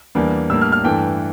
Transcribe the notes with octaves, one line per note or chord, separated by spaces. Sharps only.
E2 E3 G3 A#3 D4
A2 G3 A#3 D4 E6
F6
F6
G2 E3 A3 D4 G5